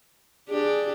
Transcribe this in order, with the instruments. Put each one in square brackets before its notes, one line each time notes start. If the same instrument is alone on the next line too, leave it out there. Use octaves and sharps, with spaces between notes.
[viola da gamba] D4 G4 [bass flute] G#4